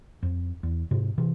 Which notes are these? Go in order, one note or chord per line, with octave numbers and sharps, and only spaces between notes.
F2
E2
G#2 C3
C3 E3